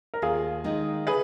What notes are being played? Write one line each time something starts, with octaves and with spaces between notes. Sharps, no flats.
A#4
D#2 F4 G#4
D#3 G#3 D#4
G#4 B4